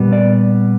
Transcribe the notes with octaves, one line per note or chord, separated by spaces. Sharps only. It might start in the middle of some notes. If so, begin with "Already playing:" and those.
Already playing: A#2 G3 B3
D5